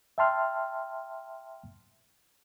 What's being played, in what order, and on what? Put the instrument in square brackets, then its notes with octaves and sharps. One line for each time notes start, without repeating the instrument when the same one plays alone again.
[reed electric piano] E5 G5 A5 C6 F6